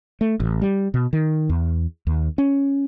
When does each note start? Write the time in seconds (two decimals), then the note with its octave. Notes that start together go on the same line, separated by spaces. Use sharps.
0.21 A3
0.40 A1
0.62 G3
0.94 B2
1.13 D#3
1.49 E2
2.07 D#2
2.38 C#4